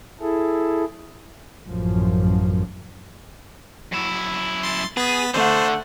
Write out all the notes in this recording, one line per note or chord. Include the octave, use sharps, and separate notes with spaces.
E4 G#4 A4
A1 F#2 F3
F#2 E4
C6 A6
B3 G#4 A6 B6
D3 A3 C5 F#5